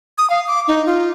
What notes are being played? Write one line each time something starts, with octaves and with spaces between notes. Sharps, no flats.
D#6
F5
D6
D#4
F4